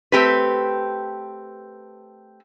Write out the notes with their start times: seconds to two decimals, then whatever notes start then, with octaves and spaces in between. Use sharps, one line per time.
0.12 A3 C4 G4 B4